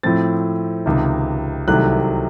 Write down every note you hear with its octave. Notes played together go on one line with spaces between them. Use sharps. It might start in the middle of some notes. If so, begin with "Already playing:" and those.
A2 F3 C4 A6
C#2 C3 D#3
C2 C3 D#3 F#3 A3 F#6